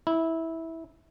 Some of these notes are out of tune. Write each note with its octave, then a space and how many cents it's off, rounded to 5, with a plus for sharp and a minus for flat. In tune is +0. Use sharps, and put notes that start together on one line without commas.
E4 -15